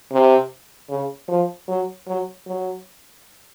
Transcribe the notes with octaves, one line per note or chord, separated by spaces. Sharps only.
C3
C#3
F3
F#3
F#3
F#3